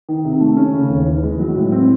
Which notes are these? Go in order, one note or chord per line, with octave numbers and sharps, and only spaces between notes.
D#3
C3
A3
C#4
C#3
D#2
E3
G#3
F#3
A2
C4